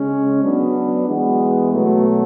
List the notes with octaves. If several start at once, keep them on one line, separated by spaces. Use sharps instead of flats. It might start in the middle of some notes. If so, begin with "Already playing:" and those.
Already playing: C#3 G#3 C#4
F#3 B3 D4
E3 G#3 B3 F#4
B2 F#3 A3